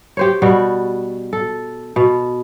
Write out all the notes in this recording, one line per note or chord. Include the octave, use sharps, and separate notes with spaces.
G4 C5 C#5
B2 G3 F#4
A4
B2